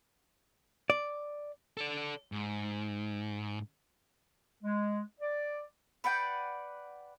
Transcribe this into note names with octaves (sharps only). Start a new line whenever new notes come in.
D5
A4 D5
G#2
G#3
D5
B4 D5 F#5 G5